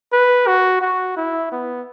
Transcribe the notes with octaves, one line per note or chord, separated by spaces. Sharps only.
B4
F#4
F#4
E4
B3